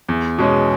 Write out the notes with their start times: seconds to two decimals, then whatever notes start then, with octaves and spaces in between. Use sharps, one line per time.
0.09 E2
0.38 B2 G#3 C#4